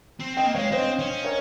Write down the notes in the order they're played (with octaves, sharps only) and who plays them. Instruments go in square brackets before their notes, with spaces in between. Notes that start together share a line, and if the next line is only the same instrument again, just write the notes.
[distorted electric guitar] C4
[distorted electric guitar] C4 [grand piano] D#5 G5
[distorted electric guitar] A#3
[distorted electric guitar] G#3 [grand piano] C#5 F5
[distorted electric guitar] C4 [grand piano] C5 D#5
[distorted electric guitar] C#4
[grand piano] A#4 C#5